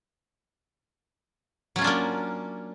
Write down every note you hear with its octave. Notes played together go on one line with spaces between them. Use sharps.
F#3 A#3 C#4 D4 F4